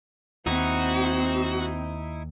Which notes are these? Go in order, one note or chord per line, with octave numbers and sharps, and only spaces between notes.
D#2 C4 D#4 E4 F#4